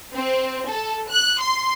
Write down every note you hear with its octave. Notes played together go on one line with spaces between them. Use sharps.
C4
A4
F#6
C6